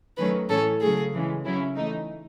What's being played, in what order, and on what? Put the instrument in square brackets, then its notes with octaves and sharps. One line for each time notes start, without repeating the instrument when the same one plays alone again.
[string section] D#3 F#3 A3 C#4 [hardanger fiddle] B4
[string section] A2 E3 A3 C#4 [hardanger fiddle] A4
[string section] C#3 F#3 A3 [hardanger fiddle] G#4
[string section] C#3 E3 G#3
C#3 F#3 C#4 E4
E3 A3 D#4